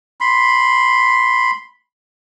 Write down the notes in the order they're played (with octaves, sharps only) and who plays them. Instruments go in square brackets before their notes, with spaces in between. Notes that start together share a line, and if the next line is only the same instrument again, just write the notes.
[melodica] B5 C6